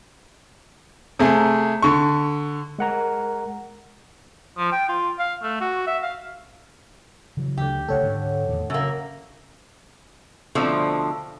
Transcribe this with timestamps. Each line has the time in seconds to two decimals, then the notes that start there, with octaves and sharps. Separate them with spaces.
1.19 C3 A3 G#4
1.82 D3 C#6
2.79 G#3 A#4 F#5 A#5
4.58 F3
4.73 G5
4.89 F4
5.20 F5
5.43 A3
5.61 F#4
5.87 E5
6.03 F5
7.37 C#3 E3 F#3
7.58 D2 D3 G4
7.88 C#2 C#3 A3 A4 C#5 F#5
8.03 G#2 D3
8.48 E2 A2 D#3
8.70 F#2 C#3 A#3
10.55 B2 D3 F3 A3 C4